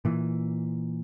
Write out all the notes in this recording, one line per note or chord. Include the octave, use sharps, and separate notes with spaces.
A#2 E3